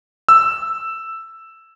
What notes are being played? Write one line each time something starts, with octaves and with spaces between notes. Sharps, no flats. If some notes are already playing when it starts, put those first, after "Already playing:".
E6